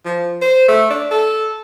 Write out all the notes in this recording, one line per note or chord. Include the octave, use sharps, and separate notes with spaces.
F3
C5
A3
D4
A4